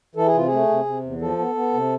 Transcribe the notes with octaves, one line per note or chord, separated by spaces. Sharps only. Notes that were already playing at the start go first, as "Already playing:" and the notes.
E3 A4
G#4
C3 F4
G#4
A3
C3
C3
E2
F3 A4
B3
B3
C3